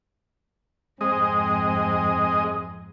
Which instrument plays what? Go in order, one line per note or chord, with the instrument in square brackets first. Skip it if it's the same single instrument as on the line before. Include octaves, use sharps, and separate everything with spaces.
[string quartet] F2 G#2 [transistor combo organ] G#3 D#5 [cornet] C4